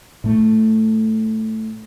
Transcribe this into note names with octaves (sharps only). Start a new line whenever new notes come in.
A2 A3